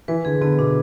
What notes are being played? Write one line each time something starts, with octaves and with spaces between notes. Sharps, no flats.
E3 B4
D3 G#4
D3 B3
B2 D4